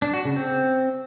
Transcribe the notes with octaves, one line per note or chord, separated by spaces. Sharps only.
D4
F#4
C#3
C4